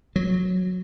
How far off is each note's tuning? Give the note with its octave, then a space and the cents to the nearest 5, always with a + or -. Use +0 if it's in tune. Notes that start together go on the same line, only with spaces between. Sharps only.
F#3 -10